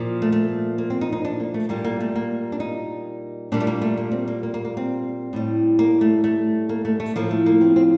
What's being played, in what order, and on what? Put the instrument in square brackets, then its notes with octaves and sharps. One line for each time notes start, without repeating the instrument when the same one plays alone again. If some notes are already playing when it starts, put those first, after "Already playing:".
Already playing: [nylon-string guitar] A#2 F3
A3
A3
A#3
C4
D#4
D#4
D4
A#3
A3
A#2 G3 A#3
A#3
A3
A#3
D4
D#4
A#2 G3 D4
A3
A#3
A3
A#3
C4
A#3
A#3
A#3
A#3
C4
A2 G3
A#3
A3
A3
A#3
A3
A3
A2 F3 A#3
A3
A#3
C4
C4